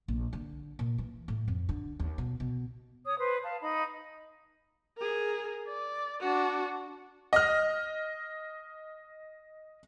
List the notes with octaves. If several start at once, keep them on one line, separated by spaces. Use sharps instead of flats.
A#1
D3
A#2
E3
A2
F2
D3
D#2
B2
B2
C#5 D#6
B4 C5
F5 A5
D#4 B5
G#4 A#4
D5
D4 F#4
D#5 F6